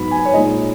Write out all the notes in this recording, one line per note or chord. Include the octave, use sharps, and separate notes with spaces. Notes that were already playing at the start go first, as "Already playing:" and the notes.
Already playing: G#2 F#3 B3 B5
G#5
C#5
A#2 G#3 D#4 D#5